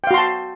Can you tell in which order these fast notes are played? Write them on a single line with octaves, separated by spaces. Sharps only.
G5 F5 F#4 C6 A5